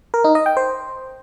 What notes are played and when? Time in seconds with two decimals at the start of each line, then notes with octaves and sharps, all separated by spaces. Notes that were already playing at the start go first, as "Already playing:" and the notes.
0.14 A#4
0.24 D#4
0.35 D#5
0.46 G5
0.57 C5